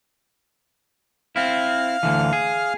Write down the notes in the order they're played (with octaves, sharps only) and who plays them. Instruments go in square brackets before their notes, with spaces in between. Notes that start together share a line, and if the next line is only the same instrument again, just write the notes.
[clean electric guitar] C4 E4 [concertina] F5 F6
[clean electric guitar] D2 D3 E3
G#4